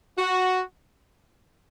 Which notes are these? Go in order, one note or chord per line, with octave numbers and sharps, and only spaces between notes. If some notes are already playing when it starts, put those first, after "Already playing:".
F#4